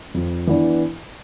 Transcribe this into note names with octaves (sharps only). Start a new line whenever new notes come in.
F2
E3 B3 D4